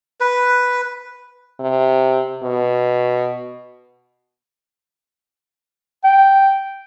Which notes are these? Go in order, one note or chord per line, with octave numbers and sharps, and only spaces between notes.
B4
C3
B2
G5